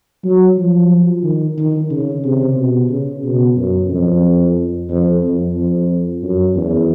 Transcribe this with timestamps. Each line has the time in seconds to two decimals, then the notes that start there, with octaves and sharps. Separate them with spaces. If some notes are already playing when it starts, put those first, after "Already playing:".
0.25 F#3
0.58 F3
1.23 D#3
1.57 D#3
1.90 C#3
2.24 C3
2.57 B2
2.89 C#3
3.24 B2
3.56 F#2
3.90 F2
4.89 F2
5.22 F2
5.56 F2
6.23 F#2
6.56 E2